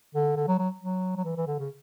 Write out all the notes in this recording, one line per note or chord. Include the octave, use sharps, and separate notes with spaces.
D3
D3
F#3
F#3
F#3
F#3
E3
E3
D3
C#3